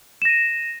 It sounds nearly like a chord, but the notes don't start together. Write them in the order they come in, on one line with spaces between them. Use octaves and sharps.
E7 A#6 D#7